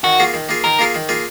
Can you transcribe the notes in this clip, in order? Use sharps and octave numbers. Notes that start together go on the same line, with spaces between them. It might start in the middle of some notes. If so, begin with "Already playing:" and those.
D#3 F#4
A#3 F4 G#4
D#3
A#3 F4 G#4
D#3 A#4
A#3 F4 G#4
D#3
A#3 F4 G#4